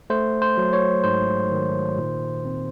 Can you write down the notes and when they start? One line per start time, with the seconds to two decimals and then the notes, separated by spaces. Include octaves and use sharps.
0.10 A3 C5
0.42 C5
0.57 F#3
0.73 C#5
1.04 G#2 C5
1.52 D#3
1.98 A#2
2.45 C4